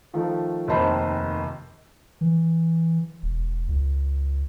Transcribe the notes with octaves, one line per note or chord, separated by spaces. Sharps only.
D#3 F3 A3
F1 D#2 D#3 C5 A5 B5
E3
E1
C#2